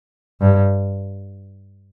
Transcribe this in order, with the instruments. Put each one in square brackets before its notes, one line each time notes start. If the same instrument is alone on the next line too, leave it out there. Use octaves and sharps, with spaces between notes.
[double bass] G2